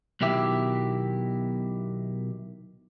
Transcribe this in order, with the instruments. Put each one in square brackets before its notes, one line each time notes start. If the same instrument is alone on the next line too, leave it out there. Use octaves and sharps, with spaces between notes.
[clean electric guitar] B1 B2 D#3 E4 G4 E5